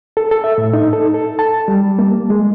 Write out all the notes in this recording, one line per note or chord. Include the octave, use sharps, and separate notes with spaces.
A4
A4
E5
A2
D#4
A4
A4
A5
G3
A#3
G#3